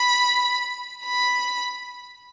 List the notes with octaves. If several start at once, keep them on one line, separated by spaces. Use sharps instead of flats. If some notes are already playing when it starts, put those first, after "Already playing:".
Already playing: B5
B5